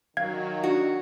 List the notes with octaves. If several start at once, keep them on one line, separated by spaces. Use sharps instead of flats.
D#3 F#3 F5 G#6
D4 F#4